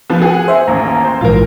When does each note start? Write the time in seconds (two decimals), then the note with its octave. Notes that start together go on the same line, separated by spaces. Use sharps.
0.10 F3 B3
0.22 G#4 F#5 G#5
0.48 C5 E5
0.67 A1 D#2 A#5
1.04 C5
1.21 A#1 G#2 E3 F4 A#4